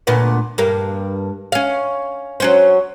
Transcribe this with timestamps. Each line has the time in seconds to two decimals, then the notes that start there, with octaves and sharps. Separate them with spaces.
0.07 D2 A#2 B3
0.58 G2 A#3
1.52 C#4 F5
2.40 F#3 C#4 C5